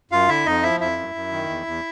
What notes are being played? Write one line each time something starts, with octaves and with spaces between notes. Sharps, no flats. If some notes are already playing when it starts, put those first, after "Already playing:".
F#2 F4 F5
D3 E4 E5
F2 D#4 D#5
F3 E4 E5
F2 E4 E5
F#2
F#2
D#3
E2
E2